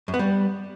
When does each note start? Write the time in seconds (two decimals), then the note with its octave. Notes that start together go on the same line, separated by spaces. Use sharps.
0.08 F#2
0.14 B3
0.19 G3